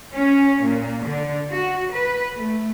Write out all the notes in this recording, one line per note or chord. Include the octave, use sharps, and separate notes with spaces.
C#4
A#2
D3
F#4
B4
A3